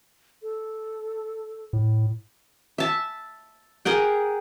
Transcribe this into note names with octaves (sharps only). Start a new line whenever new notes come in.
A4
A2
E5 A5
G#4 A#4 F#5 G5